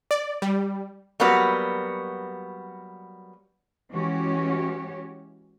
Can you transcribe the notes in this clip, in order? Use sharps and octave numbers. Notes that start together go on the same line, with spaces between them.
D5
G3
F#3 G3 A#3 B3 F#4
E3 G#3 C#4 F#4 G4 C#5